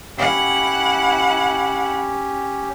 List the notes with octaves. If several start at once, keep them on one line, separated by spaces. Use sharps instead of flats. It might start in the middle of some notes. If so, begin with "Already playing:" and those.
C#4 E4 G4 F#5